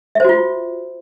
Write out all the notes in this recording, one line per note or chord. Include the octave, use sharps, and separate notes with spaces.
F4 F#4 C5 E5